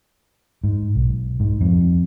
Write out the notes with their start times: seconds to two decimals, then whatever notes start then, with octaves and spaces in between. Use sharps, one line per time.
0.64 G#2
0.95 B1
1.40 G#2
1.61 F2